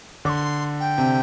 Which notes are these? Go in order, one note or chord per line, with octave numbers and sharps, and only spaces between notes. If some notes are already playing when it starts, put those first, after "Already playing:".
D3 C6 D6
G5
C3